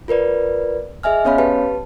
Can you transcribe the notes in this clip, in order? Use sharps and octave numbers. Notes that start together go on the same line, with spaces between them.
F4 A#4 B4 D5
G#4 D#5 E5 G#5 F6
B3 C#4 C#5 F5 B5
G4 B4 A5